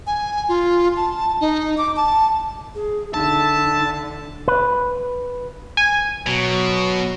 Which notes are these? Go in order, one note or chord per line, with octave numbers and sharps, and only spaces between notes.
G#5
F4
A5
D#4
D6
A5
G#4
D3 D#4 E5 A5
B4
G#5
B2 F#3